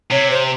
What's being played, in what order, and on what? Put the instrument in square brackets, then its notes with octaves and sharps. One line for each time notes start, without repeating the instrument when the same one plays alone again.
[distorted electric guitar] C3 [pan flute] C#5
[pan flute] C5